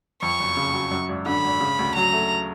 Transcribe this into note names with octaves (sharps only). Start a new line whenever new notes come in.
F2 C#6
F#1
C#3
F#3
F#2
G#1
D3 B5
G#1
C#3
D2
F#3 A#5
A3